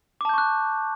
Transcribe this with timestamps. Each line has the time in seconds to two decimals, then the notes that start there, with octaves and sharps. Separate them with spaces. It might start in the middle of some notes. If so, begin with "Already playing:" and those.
0.21 D6
0.25 A5
0.29 G6
0.34 C#6
0.38 F#6